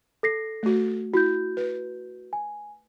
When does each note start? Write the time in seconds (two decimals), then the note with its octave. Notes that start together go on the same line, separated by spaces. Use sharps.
0.23 A4 A#6 C7
0.63 A3 F#4
1.14 E4 F#4 G6
1.57 B4
2.33 G#5